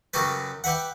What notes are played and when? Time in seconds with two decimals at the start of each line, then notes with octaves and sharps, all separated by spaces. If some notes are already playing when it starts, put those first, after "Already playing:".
0.14 F#2 C#3 F#3 G4 A4 B4
0.64 G4 B4 E5 F#5